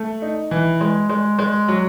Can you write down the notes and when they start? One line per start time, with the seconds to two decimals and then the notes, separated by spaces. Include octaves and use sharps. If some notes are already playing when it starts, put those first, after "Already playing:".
Already playing: A3
0.22 D#4
0.51 E3
0.81 G#3
1.09 G#3
1.39 G#3
1.68 F#3